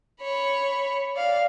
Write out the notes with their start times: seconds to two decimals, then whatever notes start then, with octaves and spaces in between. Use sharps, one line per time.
0.22 C#5 B5
1.15 D5 F5